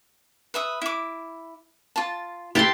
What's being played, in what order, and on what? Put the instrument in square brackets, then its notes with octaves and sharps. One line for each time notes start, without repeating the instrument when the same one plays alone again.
[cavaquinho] B4 E5 D#6
E4 D6
F4 A5
[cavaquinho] E4 B4 E5 [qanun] G4 A5 C6